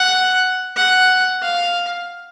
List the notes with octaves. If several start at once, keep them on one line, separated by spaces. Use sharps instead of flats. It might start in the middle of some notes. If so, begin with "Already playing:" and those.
Already playing: F#5
F#5
F5